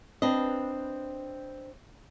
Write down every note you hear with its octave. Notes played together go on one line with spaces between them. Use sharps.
C4 D4 B4 D#5